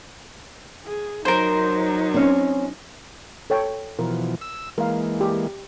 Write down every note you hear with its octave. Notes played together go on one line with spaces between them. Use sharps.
G#4
F#3 D#4 A#4 C5
C4 C#4
A4 C#5 G5
B2 E3 F3 A#4
E6
E3 G#3 A#3 A#4 F5
G4